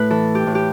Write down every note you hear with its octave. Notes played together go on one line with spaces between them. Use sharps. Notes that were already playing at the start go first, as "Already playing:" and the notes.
Already playing: A2 B4
E3 A4
G4
A2
G4